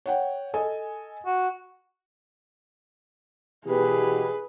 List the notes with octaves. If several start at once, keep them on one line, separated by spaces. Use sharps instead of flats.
C#5 F#5 G5
A4 D#5 G#5
F#4
B2 E3 G4 G#4 B4